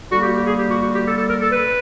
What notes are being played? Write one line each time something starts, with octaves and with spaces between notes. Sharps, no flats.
D3 G3 A#3 F#4
G4
G4
G#4
G4
F#4
F#4
G4
A4
A4
A#4
A4
B4